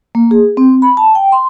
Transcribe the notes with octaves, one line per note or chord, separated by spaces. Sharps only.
A#3
G#4
C4
B5
A5
G5
C6